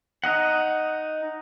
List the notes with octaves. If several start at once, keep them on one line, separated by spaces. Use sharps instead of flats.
D#4 D#5 F#5